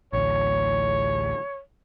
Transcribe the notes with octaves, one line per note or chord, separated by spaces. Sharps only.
A1 D2 C#5